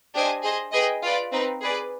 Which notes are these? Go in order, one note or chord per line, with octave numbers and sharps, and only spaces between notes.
D4 G4 C5 D#5 G#5
G#4 C5 D#5
G#4 B4 D#5 G5
F4 B4 D5
C4 D#4 B4
G#4 B4 D5